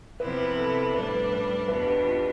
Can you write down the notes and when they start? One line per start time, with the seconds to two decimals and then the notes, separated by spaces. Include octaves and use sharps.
0.20 C3 F3 B3 E4 B4
0.58 A4
0.94 A2 G3 D4 B4
1.32 B4
1.68 E2 B2 B3 D4 B4
1.86 G4
2.05 F4